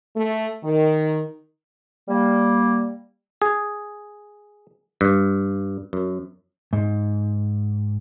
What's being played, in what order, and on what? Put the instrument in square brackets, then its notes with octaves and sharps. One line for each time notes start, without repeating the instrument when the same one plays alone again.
[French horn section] A3
D#3
[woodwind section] G3 A#3
[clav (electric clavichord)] G#4
G2
F#2
[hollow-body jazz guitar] G#2